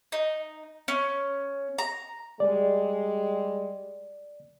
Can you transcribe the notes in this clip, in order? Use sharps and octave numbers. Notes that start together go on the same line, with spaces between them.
D#4
C#4
A#5
G3 G#3 D5